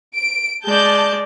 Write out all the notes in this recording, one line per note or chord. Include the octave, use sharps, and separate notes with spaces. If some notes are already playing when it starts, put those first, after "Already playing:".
D7
G#3 D5 A5 G6